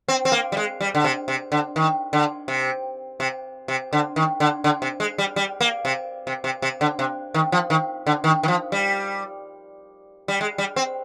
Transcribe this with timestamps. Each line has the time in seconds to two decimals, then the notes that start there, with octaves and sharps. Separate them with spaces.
0.08 C4
0.25 C4
0.32 A#3
0.52 G3
0.57 G#3
0.81 G3
0.95 D3
1.04 C3
1.28 C3
1.52 D3
1.76 D#3
2.13 D3
2.48 C3
3.20 C3
3.68 C3
3.93 D3
4.16 D#3
4.40 D3
4.64 D3
4.82 C3
5.00 G#3
5.18 G3
5.36 G3
5.61 A#3
5.85 C3
6.27 C3
6.44 C3
6.62 C3
6.81 D3
6.99 C3
7.34 D#3
7.52 F3
7.70 D#3
8.07 D3
8.24 D#3
8.43 D#3
8.48 F3
8.72 G3
10.28 G3
10.41 G#3
10.58 G3
10.76 C4